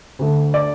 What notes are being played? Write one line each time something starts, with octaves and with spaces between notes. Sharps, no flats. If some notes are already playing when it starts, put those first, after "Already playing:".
D2 D3 A3
D5